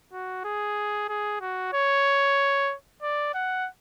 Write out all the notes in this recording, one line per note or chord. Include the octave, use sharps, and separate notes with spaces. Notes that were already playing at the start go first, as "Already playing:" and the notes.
F#4
G#4
G#4
F#4
C#5
D5
F#5